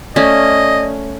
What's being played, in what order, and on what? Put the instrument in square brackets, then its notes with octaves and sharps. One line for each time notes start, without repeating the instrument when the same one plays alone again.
[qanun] A3 C#4 [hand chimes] D5 [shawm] D#5